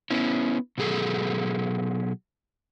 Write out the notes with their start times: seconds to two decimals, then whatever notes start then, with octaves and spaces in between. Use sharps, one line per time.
0.10 B3 C#4 E4
0.78 B2 F#3 G#4 A4